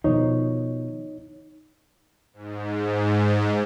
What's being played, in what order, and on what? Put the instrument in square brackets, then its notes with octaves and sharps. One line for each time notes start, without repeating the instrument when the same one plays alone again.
[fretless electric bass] B2 D#3 F3 [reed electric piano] D#4 C#5
[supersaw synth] G#2